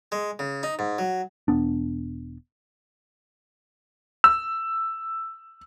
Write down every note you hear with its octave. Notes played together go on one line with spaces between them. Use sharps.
G#3
C#3
D#4
G#2
F#3
E1 B3 D4
E6